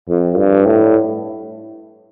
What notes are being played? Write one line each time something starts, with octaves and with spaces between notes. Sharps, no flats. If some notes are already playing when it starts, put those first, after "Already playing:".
F2
G2
A2